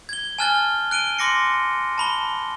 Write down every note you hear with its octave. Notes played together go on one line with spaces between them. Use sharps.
G#6 G7
G#5 A5 F6 F#6 A6 G7
F#6 D7 D#7 G7
C6 D6 A#6 C#7
A5 B5 G7